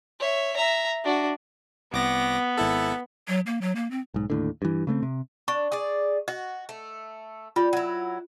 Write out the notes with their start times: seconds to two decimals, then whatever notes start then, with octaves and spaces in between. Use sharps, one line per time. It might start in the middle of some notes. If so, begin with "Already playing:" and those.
0.20 C#5 E5
0.56 E5 A#5
1.04 D4 F#4
1.93 C2 B3 D6 A#6
2.58 G#1 E4 A4
3.28 F#3
3.46 A#3
3.61 F#3
3.76 A#3
3.91 C4
4.14 B1 G#2
4.30 D#2 A2 D3
4.62 G2 E3
4.87 C#3 A3 B3 C4
5.03 C3
5.48 D4 C#6
5.72 G#4 D5
6.28 F#4 D#5
6.69 A3
7.56 G3 F4
7.73 F#3 E4